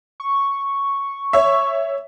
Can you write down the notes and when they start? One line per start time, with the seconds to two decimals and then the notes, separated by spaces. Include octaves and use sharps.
0.20 C#6
1.33 C#5 E5